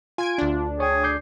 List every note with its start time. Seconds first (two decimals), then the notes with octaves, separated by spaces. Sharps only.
0.18 F4 G#5 G#6 D7
0.38 D2 D4
0.80 G#4 C#5 G5
1.04 D6 G6 C7